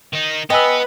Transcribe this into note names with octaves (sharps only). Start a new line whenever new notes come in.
D#3 D#4
B3 B4 D#5 G5 G#5 B5 E6